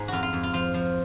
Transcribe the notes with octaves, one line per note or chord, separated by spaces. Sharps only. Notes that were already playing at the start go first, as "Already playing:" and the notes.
Already playing: G#2 D#4
F2 F4 F#4
F4
F2
F4
F3 F4
F3